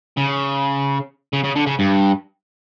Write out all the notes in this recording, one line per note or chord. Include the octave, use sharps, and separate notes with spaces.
C#3
C#3
C#3
D3
C#3
G2